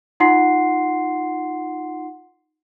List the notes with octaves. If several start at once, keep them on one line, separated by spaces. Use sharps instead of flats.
D#4 F4 F#5 C6 C7